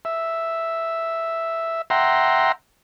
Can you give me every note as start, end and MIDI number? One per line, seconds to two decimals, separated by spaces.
0.05 1.82 76
1.90 2.52 76
1.90 2.52 78
1.90 2.52 79
1.90 2.52 82
1.90 2.52 84